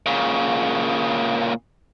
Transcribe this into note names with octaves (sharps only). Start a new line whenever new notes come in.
A#2 C#3